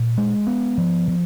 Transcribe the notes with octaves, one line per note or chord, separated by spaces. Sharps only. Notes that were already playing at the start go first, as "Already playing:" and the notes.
Already playing: A#2
G#3
B3
F3
F3